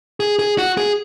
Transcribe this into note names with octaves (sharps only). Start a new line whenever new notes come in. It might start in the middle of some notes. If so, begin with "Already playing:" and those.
G#4
G#4
F#4
G#4